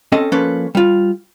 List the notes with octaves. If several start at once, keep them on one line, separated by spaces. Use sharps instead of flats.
C4 C#4 A4 D#5
F3 A#3 C#4 A4 B4
G3 F4